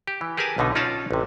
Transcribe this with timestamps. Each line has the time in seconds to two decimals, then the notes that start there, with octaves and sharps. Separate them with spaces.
0.07 G4
0.21 E3
0.37 G4 G#4 A#4 B4 G#5 A5
0.58 B1 B2 D3 D#4
0.75 C#4 D#4 F4 D5 F5 A5
1.11 A1 C3